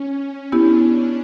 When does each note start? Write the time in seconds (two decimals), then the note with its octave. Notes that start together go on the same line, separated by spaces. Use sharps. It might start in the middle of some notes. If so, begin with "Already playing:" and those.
Already playing: C#4
0.52 B3 D4 E4 G4
0.83 C#4